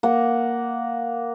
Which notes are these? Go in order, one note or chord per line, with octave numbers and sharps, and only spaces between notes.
A#3 F#5